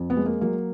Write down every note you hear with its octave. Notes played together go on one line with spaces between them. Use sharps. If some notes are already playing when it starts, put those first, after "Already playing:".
Already playing: F2
B3
G#3
A#3
F#3 A#3